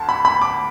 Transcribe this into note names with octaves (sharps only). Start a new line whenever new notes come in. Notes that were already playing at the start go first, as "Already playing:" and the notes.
Already playing: D2 A5
B5
B5
D6